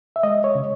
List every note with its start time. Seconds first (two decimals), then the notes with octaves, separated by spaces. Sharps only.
0.16 E5
0.23 G#3 D#5
0.44 C#5
0.55 C#3